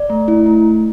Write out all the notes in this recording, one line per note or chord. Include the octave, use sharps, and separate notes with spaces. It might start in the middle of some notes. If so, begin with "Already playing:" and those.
Already playing: D5
A3
E4
A3